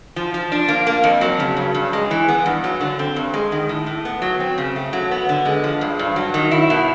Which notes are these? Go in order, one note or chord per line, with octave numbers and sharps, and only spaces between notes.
F3
F3
D4
A#3
A#3
F2
F#3
C#3
G2
G2
G#3
E3
B3
G2
F#3
D3
C4
G2
G#3
D#3
A2
A2
B3
F#3
C4
C#3
A3
F#3
B3
D3
G#3
F3
G2
G2
F#3
D#3
E4
B2